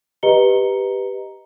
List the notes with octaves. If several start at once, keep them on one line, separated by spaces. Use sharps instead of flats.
G4 B4 D#5 A#5 C#7 G7